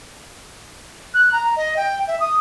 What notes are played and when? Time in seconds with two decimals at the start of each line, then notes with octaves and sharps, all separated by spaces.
1.14 F#6
1.32 A#5
1.56 D#5
1.77 G5
2.07 E5
2.20 D#6